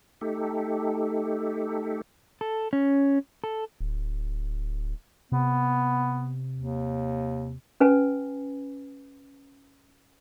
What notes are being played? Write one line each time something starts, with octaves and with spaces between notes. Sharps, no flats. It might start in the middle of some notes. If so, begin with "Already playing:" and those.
A3 D#4 G4 A4
A4
C#4
A4
D1
C3 B3
D#2
C#4 B4 G#5